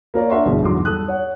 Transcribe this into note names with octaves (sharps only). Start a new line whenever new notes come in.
A#3 A#4 C#5 D5
D4 A#4 E5 F#5 C6 C#6
G1 B2 E3 G3 G#4
E2 G#2 D3 F#3 C6 D6
G3 A4 D#6 F#6
C#5 F#5